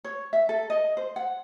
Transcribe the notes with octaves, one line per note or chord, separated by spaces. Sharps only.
C#5
E5
A4
D#5
C5
F#5